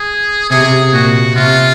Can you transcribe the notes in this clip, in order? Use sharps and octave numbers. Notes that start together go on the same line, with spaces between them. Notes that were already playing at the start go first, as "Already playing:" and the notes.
Already playing: G#4
C3 G#4
A#2 F#4
C3 F4